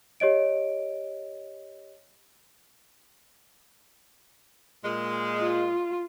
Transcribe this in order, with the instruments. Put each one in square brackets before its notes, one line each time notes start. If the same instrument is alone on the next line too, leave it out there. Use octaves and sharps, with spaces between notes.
[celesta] G4 C#5 D#5 D7
[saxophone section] A#2 G#3
[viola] F4